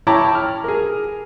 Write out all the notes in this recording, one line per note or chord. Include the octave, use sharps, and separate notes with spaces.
E4 C#5 G5 A5 A#5 D6
F6
G#4 A#4